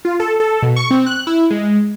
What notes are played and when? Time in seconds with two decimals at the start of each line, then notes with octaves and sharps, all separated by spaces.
0.05 F4
0.20 A4
0.40 A4
0.62 B2
0.76 C#6
0.91 C4
1.06 F#6
1.27 E4
1.51 G#3